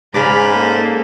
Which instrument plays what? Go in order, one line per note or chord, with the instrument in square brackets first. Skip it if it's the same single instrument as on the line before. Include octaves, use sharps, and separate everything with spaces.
[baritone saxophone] G#2 [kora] C#3 D5 [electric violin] B5 F6
[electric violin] A#3 A4